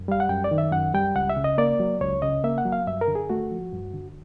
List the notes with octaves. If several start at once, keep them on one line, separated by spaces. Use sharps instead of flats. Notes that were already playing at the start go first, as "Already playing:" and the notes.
Already playing: F#2
G3 F5
F#5
F#2 G5
D5
D#3
E5
F#2 F#5
G3 G5
C#2 F#5
E5
C#3
D#5
A#3 D5
F#3
C#2 C#5
C#3 D#5
A#3 E5
F#5
F#3
F5
G2 E5
A#4
D3
G#4
A3 F#4
F3
G2
D3